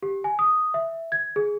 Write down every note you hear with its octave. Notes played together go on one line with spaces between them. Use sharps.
G4
G#5
D#6
E5
G#6
G#4